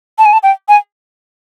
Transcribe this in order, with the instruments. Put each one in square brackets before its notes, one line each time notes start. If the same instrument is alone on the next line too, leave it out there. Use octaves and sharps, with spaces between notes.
[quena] A5
G#5
A5
G5
G#5